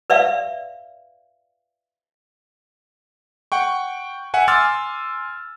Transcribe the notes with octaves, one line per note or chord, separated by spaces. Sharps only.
B4 D5 E5 F5
F#5 G5 C#6
E5 F#5 G#5
G#5 C6 D6 E6 F6 A6